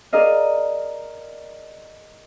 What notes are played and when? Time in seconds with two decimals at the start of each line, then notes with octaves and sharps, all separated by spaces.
0.12 G#4 A#4 D5 D#5 F5